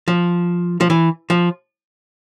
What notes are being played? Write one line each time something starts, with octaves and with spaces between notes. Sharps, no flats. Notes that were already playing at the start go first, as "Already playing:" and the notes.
F3
F3
E3
F3